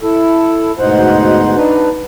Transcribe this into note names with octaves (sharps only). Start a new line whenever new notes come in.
E4 A4
D2 G#2 B2 D#4 C5 F#5
D4 D#4 B4